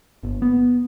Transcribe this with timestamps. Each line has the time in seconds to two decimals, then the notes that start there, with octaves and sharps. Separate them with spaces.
0.23 G1
0.42 B3